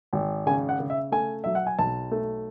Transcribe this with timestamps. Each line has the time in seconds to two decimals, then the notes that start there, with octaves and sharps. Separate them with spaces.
0.13 G#1
0.47 C#3 G#5
0.69 F#5
0.80 C#3
0.90 E5
1.12 A3 G#5
1.44 F#3 E5
1.55 F#5
1.67 G#5
1.79 B1 A5
2.11 A3